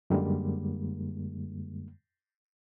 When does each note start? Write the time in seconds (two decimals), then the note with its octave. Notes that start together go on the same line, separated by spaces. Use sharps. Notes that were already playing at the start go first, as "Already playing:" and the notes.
0.10 F#2 D3 G3 G#3 A#3